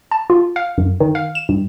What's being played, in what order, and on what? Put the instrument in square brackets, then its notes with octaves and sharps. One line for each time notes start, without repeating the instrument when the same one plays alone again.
[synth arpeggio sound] A5
F4
F5
F#2
D#3
F5
E7
G2